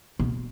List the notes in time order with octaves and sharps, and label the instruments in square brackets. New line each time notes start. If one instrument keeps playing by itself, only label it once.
[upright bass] B2